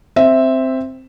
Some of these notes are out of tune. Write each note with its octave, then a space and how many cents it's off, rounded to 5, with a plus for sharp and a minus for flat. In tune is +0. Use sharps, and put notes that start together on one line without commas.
C4 +0 E5 +0